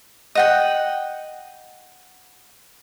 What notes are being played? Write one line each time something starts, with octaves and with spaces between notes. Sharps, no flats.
D#5 F#5 G5